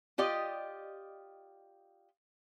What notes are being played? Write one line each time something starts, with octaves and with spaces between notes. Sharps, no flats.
F4 G4 D5 D#5